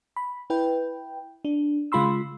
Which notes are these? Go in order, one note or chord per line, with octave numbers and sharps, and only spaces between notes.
B5
E4 B4 G5
D4
C#3 G#3 F4 B5 C6 E6